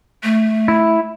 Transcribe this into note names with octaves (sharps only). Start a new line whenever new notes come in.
A3
E4